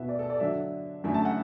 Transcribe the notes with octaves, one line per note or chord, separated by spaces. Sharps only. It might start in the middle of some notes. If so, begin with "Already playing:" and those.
Already playing: B2 B3 E4 E5
D5
A4
D5
D3 F#3 D4 E5
F#2 D3 A3 E4
A5
F#5